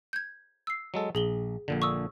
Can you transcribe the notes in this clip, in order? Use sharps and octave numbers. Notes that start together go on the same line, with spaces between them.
G6 G#6
E6 C7
F#3 G#3 A4
A#1 G#4 F#7 G7
A#1 A#2 D3
C#6 D#6 E6